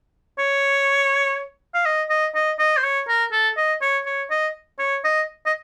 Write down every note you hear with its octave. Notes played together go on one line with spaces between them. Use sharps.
C#5
F5
D#5
D#5
D#5
D#5
C5
C#5
A#4
A4
D#5
C#5
C#5
D#5
C#5
D#5
D#5